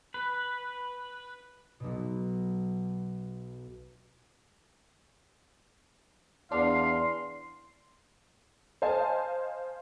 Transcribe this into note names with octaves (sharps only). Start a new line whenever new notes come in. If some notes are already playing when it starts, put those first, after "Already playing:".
B4
B1 B2
E2 D4 F5 C6
C5 D#5 F5 G#5 A5